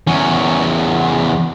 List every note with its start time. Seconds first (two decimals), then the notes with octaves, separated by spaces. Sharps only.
0.07 E2 C#4